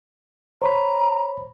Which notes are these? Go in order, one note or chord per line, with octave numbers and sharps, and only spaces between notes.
C5 C#5 A#5 B5